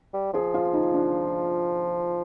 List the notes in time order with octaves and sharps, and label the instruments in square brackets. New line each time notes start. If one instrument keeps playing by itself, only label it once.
[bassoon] G3
[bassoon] F3 [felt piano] G#4
[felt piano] F4
D#4
D4